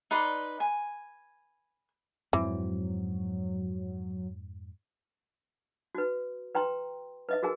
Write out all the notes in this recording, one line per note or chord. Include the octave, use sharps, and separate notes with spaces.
D#4 B4 D5 C6
G#5
F2 G#2 E3 F#3 C4
F#4 B4
B4 G5 A#5 C6
B4 D#5 E5
F#4 G#4 A#4 G#5